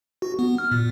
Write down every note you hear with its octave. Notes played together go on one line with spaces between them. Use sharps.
F#4
B3
F6
A#2